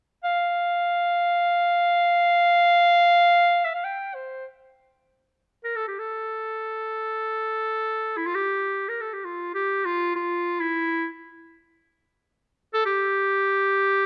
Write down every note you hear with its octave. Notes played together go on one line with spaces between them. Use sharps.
F5
E5
F5
G5
C5
A#4
A4
G4
A4
E4
F4
G4
A#4
A4
G4
F4
G4
F4
F4
E4
A4
G4